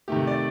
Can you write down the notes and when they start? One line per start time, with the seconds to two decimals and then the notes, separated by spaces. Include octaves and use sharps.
0.08 C3 D#3 A3 G4
0.27 D5